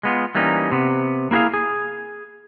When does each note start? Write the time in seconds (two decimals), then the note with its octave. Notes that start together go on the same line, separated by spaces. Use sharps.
0.03 G#3 B3 F4
0.35 E3 G3 A#3 C#4 D#4
0.71 C3 B3
1.31 A#3 E4 F#4 G#4 F5
1.54 G#4